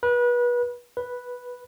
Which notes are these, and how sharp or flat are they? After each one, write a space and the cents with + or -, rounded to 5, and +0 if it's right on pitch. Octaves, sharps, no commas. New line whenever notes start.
B4 -30
B4 -5